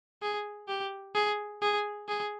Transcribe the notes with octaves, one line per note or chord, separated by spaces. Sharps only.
G#4
G4
G#4
G#4
G#4